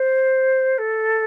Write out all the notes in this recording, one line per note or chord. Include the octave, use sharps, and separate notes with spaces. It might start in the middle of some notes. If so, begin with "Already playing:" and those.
Already playing: C5
A4